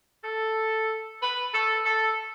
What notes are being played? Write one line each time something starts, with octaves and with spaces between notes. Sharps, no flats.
A4
B4
A4
A4